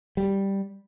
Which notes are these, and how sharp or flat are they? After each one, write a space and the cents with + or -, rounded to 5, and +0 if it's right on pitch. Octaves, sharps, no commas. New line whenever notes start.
G3 +0